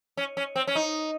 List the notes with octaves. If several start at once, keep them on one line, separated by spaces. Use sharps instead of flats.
C#4
C#4
C4
C#4
D#4